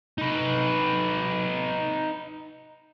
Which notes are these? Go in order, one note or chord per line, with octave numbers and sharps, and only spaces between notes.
D#4 B4